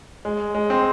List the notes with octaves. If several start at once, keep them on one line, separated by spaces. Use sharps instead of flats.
G#3
G#3
C4